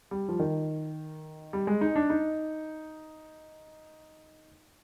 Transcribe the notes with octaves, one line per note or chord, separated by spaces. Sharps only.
G3
F3
D#3
G3
G#3
D#4
D4
D#4